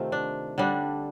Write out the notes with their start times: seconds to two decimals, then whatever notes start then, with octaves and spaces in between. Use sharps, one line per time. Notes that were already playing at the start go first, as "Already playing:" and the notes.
Already playing: C3 D#3 A3 C4 F4
0.12 D4
0.58 D3 G3 D4